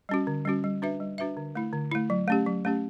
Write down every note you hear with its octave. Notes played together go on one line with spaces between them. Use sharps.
G3 C#4 F#4
D3
G3 C#4 F#4
G3
D4 F#4 B4 E5
G3
D4 F#4 B4 E5
D3
A3 E4
D3
A3 E4
F#3
A3 C#4 G4
F#3
A3 C#4 G4